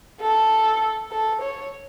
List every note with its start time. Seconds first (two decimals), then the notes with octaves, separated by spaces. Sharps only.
0.21 A4
1.11 A4
1.42 C#5